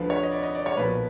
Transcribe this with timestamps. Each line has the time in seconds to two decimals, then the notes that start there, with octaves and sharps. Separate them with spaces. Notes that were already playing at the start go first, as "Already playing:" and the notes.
Already playing: D2 D3 F3 B4
0.10 C#5
0.23 D#5
0.32 D5
0.43 D#5
0.55 D5
0.66 C#5
0.77 B1 A#2 F3 B4